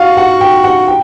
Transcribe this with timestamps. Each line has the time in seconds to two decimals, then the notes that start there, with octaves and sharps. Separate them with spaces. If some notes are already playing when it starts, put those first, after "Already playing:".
Already playing: F#4 F5
0.17 F#5
0.41 G5
0.64 F#5
0.88 G5